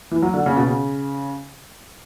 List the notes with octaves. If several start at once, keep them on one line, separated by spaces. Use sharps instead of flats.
E3
F#3
D3
C#3
B2
C#3